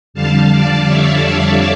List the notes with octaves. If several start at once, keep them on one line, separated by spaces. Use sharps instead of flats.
F2 D3 G3 F5 A5
D5 F5
C#5 E5